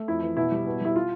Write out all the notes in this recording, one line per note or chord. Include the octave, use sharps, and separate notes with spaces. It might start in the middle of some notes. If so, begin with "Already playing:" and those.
Already playing: A3
F2 E4
E3
B2 E4
G3
B2
G3 E4
F4